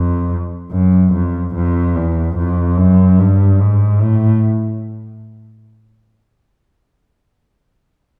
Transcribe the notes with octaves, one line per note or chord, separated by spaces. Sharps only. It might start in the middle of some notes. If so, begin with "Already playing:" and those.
Already playing: F2
F#2
F2
F2
E2
F2
F#2
G2
G#2
A2